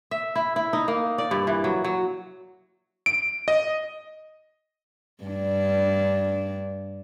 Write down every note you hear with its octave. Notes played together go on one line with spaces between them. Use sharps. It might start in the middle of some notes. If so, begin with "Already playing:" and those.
E5
E4
E4
D#4
A#3
D5
G2
E3
F#3
F#3
D7
D#5
G2 D4